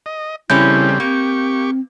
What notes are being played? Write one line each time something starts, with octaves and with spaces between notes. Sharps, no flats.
D#5
C#3 E3 G3 A3 C4 C#4 E4 G6
A#3 C4 G4 C#6